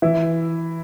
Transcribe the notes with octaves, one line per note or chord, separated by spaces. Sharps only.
E3 E4